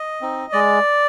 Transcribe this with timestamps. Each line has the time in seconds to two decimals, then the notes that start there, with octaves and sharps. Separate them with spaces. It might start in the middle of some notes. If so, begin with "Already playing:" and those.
Already playing: D#5
0.21 C4 D#4
0.52 G#3 D5